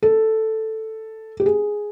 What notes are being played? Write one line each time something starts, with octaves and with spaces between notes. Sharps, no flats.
A4
G4
G#4